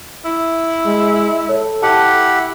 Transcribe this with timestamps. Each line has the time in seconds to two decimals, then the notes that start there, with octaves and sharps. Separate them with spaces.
0.25 E4
0.85 G#3
1.49 A4 C#5
1.83 E4 G4 F#5 A5